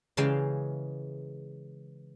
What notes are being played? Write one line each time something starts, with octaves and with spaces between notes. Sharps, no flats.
C#3 E3 G#3 F5 G5